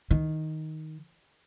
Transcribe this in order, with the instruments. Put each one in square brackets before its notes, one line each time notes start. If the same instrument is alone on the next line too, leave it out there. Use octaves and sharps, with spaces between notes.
[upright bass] D#3